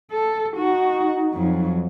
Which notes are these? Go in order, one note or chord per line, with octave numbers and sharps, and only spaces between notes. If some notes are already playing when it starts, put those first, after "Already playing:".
A4
D#4 F#4
F2 F#3